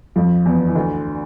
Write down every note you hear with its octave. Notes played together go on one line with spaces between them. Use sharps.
F2 F3
E2 E3
E3
D2 D3